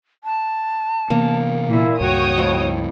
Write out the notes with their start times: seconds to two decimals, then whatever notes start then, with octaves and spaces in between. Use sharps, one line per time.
0.24 A5
1.10 C3 E3 A#3 B3
1.69 A#2 E4
2.01 C#2 G2 F#4 C#5 G5 D#6
2.38 F2 A2